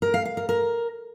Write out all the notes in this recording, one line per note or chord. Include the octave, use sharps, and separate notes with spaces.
A#4
F5
F5
A#4
A#4